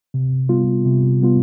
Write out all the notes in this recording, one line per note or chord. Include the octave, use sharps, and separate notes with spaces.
C3
G3 B3 F4
C3
G3 B3 F4